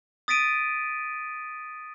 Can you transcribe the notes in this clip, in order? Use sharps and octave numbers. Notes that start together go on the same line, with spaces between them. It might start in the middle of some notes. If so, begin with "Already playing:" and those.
D#6 A6 B6 D7 D#7